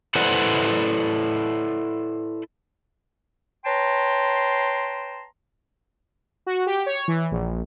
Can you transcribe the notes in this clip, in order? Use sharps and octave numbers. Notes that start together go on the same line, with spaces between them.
E4 A4 B4 C5 D5 F#5
B4 C#5 G5 A5 A#5 C6
F#4
G4
C#5
E3
A#1